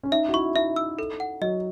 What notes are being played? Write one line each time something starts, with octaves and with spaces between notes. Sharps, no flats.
C#4
D#4 E5
F#4
E4 C#6
D#4 E5
E6
A4
F#5
F#3 D#5